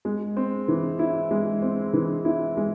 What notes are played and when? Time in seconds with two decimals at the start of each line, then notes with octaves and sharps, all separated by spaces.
0.05 G#3
0.37 C4
0.68 E3
0.99 E4
1.31 G#3
1.62 C4
1.93 E3
2.25 E4
2.57 G#3